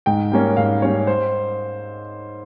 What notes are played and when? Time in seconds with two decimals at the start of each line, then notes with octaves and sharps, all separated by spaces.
0.06 G#2 G5
0.32 G3 A#3 C#4
0.57 G#2 F5
0.82 G3 A#3 C#4 C#5
1.07 C5